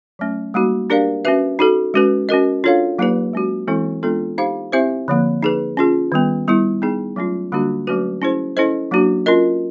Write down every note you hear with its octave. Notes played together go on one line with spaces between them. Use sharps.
F#3 A3 C#4
G3 A#3 D#4 F#4
D4 G4 A#4 D5 F5
C#4 F#4 B4 E5
D#4 F#4 A4
G#3 C#4 F#4 B4
C#4 F#4 A#4 D#5
D4 F4 A4 C#5 F5
F#3 A#3 D#4 G4 B4
G#3 C#4 F#4
E3 G#3 C4 E4 A4
G#3 B3 D4 F4 A4
D#4 G4 C5 F5
C4 E4 G4 C5 E5
D3 F3 A#3
D#4 G#4 B4
C#4 F4 G#4
D#3 G3 B3
G3 B3 E4
B3 D#4 G#4
F#3 A3 C#4 F4
D3 G3 A#3 D4 F#4
F#3 A3 C#4 F#4 B4
C#4 E4 G#4 C5
C#4 E4 A4 C5 D#5
F#3 A#3 D4 F#4
C#4 F4 A#4 D#5